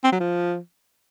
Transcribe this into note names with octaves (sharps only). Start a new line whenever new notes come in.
C4
F#3
F3